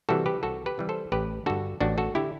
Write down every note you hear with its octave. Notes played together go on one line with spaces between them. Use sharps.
C3 E3 G3 F#4 A4
G4 B4
C2 F#4 A4
G4 B4
C3 E3 G3
A4 C5
A1 G4 B4
G2 D3 F#4 A4
A1 D4 F#4
F#4 A4
D3 E4 G4